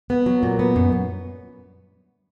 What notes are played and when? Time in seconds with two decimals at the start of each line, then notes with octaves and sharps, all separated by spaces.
0.10 B3
0.26 F#3
0.43 A#2
0.59 B3
0.76 F#2
0.92 F#2